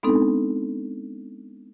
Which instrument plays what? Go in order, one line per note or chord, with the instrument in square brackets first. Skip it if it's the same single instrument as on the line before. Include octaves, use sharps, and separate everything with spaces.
[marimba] G#3 B3 C4 D4 D#4 A4